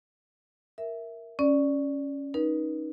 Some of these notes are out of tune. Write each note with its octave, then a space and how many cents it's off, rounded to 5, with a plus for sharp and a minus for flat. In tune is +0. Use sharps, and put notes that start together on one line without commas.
A#4 +0 E5 +0
C#4 +0 D5 +0
D#4 +0 B4 -40